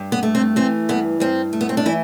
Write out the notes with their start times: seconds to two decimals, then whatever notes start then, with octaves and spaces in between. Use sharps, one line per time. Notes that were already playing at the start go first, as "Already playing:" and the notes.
Already playing: G2
0.12 B3
0.23 A3
0.35 C4
0.56 E3 C4
0.89 G2 B3
1.20 G2 C4
1.53 A3
1.61 B3
1.69 C4
1.77 D4
1.86 E3 E4